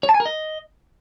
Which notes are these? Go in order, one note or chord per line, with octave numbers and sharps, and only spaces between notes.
C#5
A5
G#5
A#4
D#5